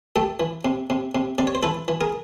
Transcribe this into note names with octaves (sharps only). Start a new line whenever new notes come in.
A3 G4 A4
E3
C3
C3
C3
C3 D5
C#5
C5
E3 A4 B4
E3
G#4 A#4